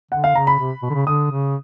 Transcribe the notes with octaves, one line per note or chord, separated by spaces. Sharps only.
D3 F#5
F5
C#3 A#5
B5
C3
B2
D3
C#3
D3 D#6
C#3